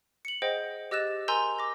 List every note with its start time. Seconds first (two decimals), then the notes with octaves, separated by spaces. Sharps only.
0.25 C#7 F#7
0.42 G#4 C5 D#5 F#5 G5
0.91 G4 D#5 E6 F#6 A6 E7
1.28 A#4 G#5 A#5 C6 E6 G6
1.58 D6 A#6